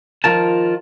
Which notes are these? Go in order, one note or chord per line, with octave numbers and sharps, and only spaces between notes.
D#3 F3 F4 A#4 A5